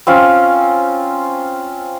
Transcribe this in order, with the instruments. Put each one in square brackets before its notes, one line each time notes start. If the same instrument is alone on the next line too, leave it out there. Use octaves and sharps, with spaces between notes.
[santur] C4 C#4 F4